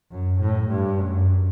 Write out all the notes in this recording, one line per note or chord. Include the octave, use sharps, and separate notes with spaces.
F#2
A2
G2
F#2